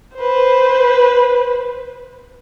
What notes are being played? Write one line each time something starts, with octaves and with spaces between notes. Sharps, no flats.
B4 C5